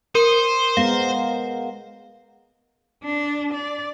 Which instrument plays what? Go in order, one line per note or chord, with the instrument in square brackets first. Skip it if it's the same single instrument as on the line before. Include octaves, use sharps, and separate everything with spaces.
[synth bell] A#4 D#7 [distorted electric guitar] C5
[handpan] G#3 B3 A#4 [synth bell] F5
[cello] D4
D5